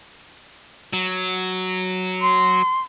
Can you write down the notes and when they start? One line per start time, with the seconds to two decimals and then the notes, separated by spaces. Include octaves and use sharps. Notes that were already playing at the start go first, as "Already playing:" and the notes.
0.93 F#3
2.22 C6